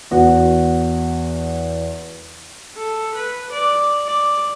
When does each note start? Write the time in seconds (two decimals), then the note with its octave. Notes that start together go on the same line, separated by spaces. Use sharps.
0.11 E2 F#4
2.77 A4
3.15 B4
3.53 D5
4.07 D5